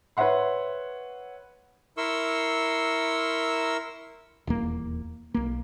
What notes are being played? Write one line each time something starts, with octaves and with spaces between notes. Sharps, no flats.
B4 C#5 E5 F#5 C6
E4 A#4 C6 C#6 E6
D#1 E2 A#3
B1 A#3